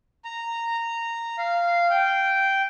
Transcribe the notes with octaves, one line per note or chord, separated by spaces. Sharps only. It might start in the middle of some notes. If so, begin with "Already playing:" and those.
A#5
F5
G5